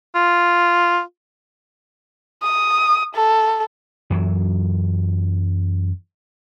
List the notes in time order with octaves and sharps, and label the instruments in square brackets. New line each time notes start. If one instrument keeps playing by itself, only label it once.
[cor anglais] F4
[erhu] D#6
A4
[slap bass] F#2 E3 F#3